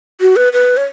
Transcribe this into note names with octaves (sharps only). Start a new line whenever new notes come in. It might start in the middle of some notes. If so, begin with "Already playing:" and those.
F#4
B4
B4
C#5